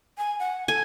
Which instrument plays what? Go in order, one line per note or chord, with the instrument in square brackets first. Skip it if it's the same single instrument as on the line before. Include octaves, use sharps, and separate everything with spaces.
[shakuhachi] G#5
F#5
[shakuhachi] A4 [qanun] G#5